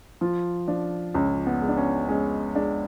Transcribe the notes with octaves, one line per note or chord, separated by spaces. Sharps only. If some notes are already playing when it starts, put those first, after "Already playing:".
F3 F4
F3 D4
C#2 C#4
B3
G#3
D4
C#4
G#3 C#4
G#3 D4